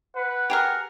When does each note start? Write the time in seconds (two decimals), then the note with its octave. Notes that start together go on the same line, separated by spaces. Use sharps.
0.16 B4 F#5
0.50 G4 G#4 A#4